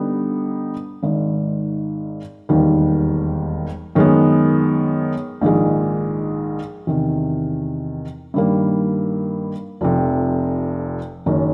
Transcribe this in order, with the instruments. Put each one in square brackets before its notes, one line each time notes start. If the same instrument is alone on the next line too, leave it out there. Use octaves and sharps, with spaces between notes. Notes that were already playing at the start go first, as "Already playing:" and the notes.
Already playing: [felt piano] D3 G3 B3 D#4
G#1 G#2 D#3
E1 D#2 D#3 G3
F#2 D#3 G#3 B3
A#1 G#2 D#3 G#3
E2 C3 D#3
G2 D#3 G3 A#3
F1 F2 C3
F#1 F#2 D#3